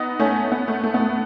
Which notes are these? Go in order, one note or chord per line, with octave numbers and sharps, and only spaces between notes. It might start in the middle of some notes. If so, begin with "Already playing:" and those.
Already playing: B3 D#4
A3 C#4
B3
A3
A3
B3
A3